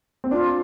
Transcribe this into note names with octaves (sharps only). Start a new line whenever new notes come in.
C4
D4 F4